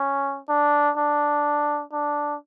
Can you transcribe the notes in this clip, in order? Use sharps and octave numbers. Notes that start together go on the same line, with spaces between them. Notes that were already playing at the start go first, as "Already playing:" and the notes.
Already playing: C#4
D4
D4
D4